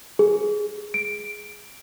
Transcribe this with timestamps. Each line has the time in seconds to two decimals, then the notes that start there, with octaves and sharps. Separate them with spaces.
0.19 G#4
0.94 D7